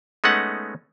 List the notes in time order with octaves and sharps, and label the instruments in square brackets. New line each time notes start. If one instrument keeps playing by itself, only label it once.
[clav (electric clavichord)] G#3 A3 B3 C#4 D#4 F#5